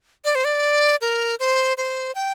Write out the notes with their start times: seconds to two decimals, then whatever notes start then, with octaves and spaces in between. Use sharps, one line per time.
0.25 D5
0.35 C5
0.45 D5
1.01 A#4
1.40 C5
1.78 C5
2.15 G5